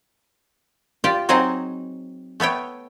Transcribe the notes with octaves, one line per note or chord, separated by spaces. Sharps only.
F4 G4 D5
F#3 C4 D#4 G#4 C5 D#5
A3 B3 C#5 G5